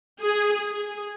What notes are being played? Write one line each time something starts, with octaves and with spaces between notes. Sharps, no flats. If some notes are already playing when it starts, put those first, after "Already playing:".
G#4
G#4